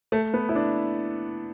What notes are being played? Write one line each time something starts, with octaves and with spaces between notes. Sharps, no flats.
A3
B3
E4
D4